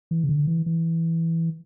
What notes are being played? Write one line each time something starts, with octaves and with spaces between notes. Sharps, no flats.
E3
C#3
D3
E3
E3